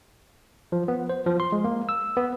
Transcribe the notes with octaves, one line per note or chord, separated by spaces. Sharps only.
F3
B3
C5
F3
C6
G#3
A#3
E6
B3